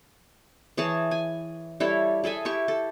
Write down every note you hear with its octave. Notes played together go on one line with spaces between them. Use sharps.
E3 G#4 C#5 A5
G#5
G3 E4 A4 C#5
G#4 A4 E5 G#5
E4 G4 C#6
A4